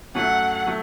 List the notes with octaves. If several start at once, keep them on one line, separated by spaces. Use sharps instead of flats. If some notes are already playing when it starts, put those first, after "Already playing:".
F#2 F#3 A3 F#5
F#3 A3